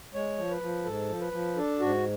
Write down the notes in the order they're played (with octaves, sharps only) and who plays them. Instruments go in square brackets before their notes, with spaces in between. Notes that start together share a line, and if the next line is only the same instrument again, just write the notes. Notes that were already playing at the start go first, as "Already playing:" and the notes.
[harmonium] G#3 C#5
F3
B4
F3
G#2 A4
F3
B4
F3
D4 A4
G#2 F#4